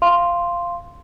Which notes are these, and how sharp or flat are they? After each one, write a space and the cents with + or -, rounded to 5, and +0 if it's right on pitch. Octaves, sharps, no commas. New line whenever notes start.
F5 -10 C6 +0